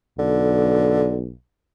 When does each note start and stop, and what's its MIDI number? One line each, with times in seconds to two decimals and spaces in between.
0.19 1.31 35
0.19 1.16 50